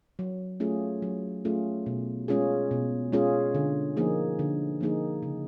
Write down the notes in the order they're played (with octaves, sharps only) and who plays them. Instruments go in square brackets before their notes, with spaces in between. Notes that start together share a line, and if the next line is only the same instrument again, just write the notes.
[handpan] F#3
A3 C#4 F4 G#4
F#3
A3 C#4 F4 G#4
B2
G#3 C#4 F4 G#4
B2
G#3 C#4 F4 G#4
D3
F3 A#3 D#4 G#4
D3
F3 A#3 D#4 G#4
C#3